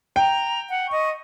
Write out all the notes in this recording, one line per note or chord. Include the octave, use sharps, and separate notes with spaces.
G5 A#5
F#5
D#5 C#6